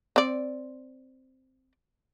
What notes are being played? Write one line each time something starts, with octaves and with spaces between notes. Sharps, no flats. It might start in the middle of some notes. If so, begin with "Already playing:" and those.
C4 D5